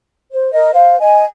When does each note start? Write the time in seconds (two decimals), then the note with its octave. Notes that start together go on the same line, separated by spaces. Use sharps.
0.32 C5
0.53 A#4 D#5
0.73 C5 F5
0.99 D#5 G#5